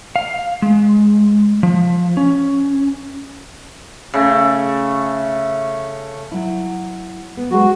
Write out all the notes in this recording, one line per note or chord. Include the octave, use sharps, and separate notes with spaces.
F5
G#3
F3
C#4
C#3 A3
F#3 E4
B3
F#3 G#3 F#4